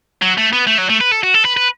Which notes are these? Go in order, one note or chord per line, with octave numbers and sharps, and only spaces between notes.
F#3
A3
B3
A3
F#3
A3
B4
A4
F#4
A4
B4
B4